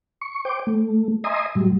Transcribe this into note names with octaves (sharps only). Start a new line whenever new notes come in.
C#6
C5 G5 D6
A3
D#5 E5 G#5 A#5 C6 D#6
A2 F#3 G3